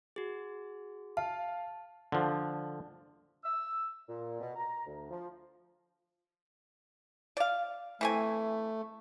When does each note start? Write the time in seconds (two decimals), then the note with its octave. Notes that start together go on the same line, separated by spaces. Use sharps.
0.16 F#4 G#4
1.17 F5 A5
2.12 D3 F3
3.44 E6
4.08 A#2
4.41 B2
4.56 A#5
4.86 D2
5.11 F3
7.37 D5 F5
8.01 E3 A3 C4 G#5